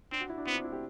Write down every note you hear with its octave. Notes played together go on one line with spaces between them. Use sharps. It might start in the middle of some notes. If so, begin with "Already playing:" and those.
C4 D4
F#4
E4
D4
B3 C4
D4
E4
G4